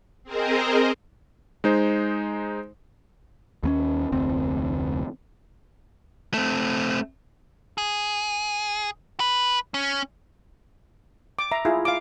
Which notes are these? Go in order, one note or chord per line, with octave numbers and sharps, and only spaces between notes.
C4 G#4 A#4 C5 D#5
G#3 D#4 C5
D#2 B3 C#4
F1 D2 C4
A3 C4
G#4
B4
C#4
D6
E5 A#5
E4 F4 G#4
F5 D6